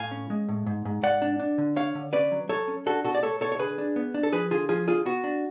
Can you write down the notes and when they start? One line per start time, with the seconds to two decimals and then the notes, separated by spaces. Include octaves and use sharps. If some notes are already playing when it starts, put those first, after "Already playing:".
Already playing: A2 F5 G#5
0.11 C#4
0.30 G#3
0.49 A2
0.67 G#2
0.85 G#2
1.03 G#2 D5 F#5
1.22 D4
1.39 D4
1.58 D3
1.76 D4 C#5 F5
1.95 D3
2.13 C#4 B4 D5
2.31 F#3
2.49 F#3 A4 C#5
2.68 C#4
2.86 D4 F#4 A4
3.04 B2 F#4 A4
3.15 D5
3.23 A3 A4 C#5
3.41 B2 A4 C#5
3.52 C#5
3.59 D3 G#4 B4
3.78 D4
3.96 B3
4.14 D4
4.23 A4
4.33 F3 G#4 B4
4.51 D3 F4 G#4
4.69 F3 F4 G#4
4.88 D3 F4 G#4
5.06 B3 F#4
5.24 D4